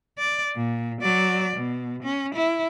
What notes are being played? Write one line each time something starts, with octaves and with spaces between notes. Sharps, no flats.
D5
A#2
F#3 D5
B2
C#4
E4